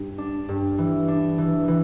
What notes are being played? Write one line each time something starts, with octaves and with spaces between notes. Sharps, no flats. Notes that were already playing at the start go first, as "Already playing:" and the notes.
Already playing: G2
D4
G2
E3
D4
E3
E3